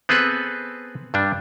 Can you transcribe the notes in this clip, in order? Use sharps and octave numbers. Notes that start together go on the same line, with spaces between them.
B3 C4 G#4 A4 B4
G2 G3 D4